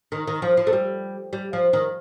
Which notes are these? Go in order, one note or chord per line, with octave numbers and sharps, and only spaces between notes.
D#3
D#3
F3
F3
A3
G3
G3
F3
D#3